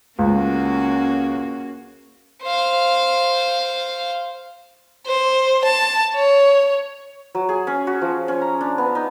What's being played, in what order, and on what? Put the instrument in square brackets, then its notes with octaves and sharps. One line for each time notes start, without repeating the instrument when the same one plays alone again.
[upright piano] C#2 [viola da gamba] A#3 C#4 F#4
[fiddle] C5 F5
[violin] C5
A5
C#5
[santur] F#3
G#4
C#4
F#4
F3
C#4
A#5
D4
B3
D#4